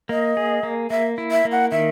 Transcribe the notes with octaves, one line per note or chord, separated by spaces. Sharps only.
A#3 D#5
G#4
A#3
A#3 E5
E4
E5
A#3
F#5
D#3 E5